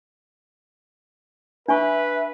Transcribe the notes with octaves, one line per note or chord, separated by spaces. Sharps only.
D4 B4 E5 G#5 C#6